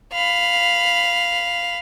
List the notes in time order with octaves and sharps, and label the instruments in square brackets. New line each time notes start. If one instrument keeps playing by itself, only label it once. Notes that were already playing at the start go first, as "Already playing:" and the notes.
[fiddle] F5 B5